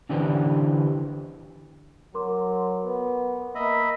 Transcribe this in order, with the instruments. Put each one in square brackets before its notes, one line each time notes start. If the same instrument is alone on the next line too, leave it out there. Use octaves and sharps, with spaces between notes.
[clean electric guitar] D3 E3 D4 G4 B4 C5
[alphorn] F#3 [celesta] A#4 C6 D6
[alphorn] B3
[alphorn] A#3 [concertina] D#5 E5 B5